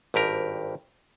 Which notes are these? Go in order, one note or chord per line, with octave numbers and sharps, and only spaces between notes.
G#1 G2 G4 A#4